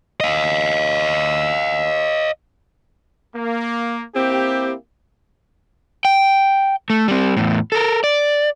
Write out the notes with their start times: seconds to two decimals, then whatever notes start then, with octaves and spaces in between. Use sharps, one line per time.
0.20 D#5 F5
3.35 A#3
4.15 A#3 C4 E4 G4
6.05 G5
6.90 A3
7.08 G3 C4
7.37 E2 A2
7.72 A4 A#4
8.04 D5